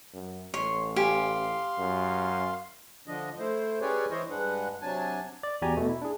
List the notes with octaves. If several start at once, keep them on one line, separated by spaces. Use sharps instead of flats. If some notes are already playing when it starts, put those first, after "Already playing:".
F#2
A1 C#5 C6
G4 F5 G#5 C6
F#2
D3 F3 D4 D#5
A3 E4 C5
C#4 G4 G#4 B4 C#5 D5
E3 E4 C5 C#5 D#5
G2 G#3 D4 B4 F#5
C3 F#3 D4 G#5 A5
D5
E2 F#4 G4 D5 G#5 A#5
B2 A3
E4
D4 G#4